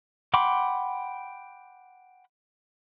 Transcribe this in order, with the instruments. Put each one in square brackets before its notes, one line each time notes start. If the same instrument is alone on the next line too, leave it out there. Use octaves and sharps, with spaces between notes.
[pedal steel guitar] F#5 G5 B5 C6 D6